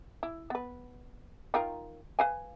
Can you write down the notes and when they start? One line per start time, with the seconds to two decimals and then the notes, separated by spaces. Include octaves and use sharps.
0.23 E4
0.50 B3 B4
1.54 D#3 F4 A#4
2.19 B4 F5 G#5